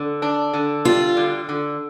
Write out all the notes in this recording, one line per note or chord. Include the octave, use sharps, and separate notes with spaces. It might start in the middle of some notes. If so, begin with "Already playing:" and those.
Already playing: D3
D4
D3
G3 F4
D3
D3